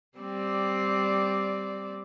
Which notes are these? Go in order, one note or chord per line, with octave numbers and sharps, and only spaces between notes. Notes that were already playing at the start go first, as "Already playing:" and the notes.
G3 C4 D5